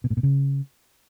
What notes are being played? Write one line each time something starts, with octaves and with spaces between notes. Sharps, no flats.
B2
A2
A#2
C#3